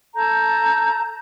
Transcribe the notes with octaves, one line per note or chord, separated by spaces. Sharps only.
A4 A5 A#5 G6